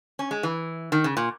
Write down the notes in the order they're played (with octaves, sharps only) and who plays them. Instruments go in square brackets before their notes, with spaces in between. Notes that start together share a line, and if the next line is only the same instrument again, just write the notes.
[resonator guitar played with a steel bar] C#4
G#3
E3
D#3
C#3
A#2